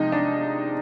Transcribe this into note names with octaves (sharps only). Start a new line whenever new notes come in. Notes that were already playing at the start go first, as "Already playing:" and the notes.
Already playing: C3 F3 G#3 D#4
D4